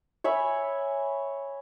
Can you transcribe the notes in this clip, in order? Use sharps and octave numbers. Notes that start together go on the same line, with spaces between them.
C#5 E5 G#5 B5